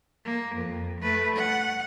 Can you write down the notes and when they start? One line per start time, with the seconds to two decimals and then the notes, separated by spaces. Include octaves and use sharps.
0.25 A#3
0.55 F2
1.01 A3 B4
1.36 F#5